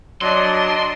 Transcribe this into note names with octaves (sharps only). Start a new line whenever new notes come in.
F#3 D4 D5 D#5 C6